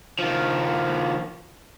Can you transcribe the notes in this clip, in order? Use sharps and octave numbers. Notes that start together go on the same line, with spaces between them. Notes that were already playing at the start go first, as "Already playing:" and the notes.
D#3 F3